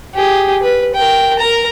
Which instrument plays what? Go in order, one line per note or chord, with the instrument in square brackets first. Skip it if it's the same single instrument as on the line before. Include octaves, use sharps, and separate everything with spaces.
[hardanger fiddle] G4 G#4
B4
A#4 G5
A#4 A#5